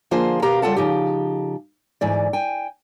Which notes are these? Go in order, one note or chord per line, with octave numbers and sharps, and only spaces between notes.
D3 F3 A#3 F4 G#4 C5
B2 G4 A#4 F5 A#5
C#3 G3 F4 A4 F#5 A5
C#3 F3 D#4 G4
D2 G#2 E3 D5
G5 G#5